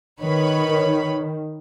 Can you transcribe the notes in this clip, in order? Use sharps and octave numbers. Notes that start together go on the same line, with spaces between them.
D#3 B4 C#5 B5